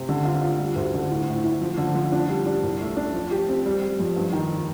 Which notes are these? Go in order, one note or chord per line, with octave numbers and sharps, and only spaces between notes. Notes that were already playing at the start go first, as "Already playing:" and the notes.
Already playing: C3
D3
F4
F4
G3
D2
D3
A2
A2
A2
F3
D3
F3
D4
G3
D4
C2
A3
D4
F3
G4
C4
G3
G3
F2
G2
D#3